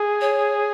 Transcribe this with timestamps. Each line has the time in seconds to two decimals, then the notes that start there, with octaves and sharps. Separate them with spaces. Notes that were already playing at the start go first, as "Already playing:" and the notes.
Already playing: G#4
0.21 C#5